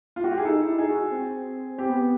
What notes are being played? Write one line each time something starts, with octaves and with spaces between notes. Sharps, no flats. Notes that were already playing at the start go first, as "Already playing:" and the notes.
F4
F#4
G4
E4 G#4
D#4 A4
E4
D#4 G#4
F#4
C4
C4 G4
B3
B3